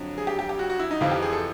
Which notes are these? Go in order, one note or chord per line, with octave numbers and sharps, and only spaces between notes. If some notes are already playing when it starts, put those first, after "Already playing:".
Already playing: F2 D3 F#3
G#4
G4
G4
G4
F#4
F#4
E4
D#4
F2 C3 E3 F4
G4
G#4
A4